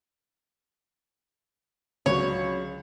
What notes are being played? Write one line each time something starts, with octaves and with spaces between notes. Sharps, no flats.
C#2 D3 F#3 C#5